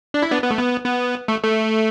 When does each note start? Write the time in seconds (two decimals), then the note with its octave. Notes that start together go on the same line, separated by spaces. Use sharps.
0.14 D4
0.22 E4
0.32 B3 D4
0.43 B3
0.51 A3
0.58 B3
0.85 B3
1.28 A3
1.43 A3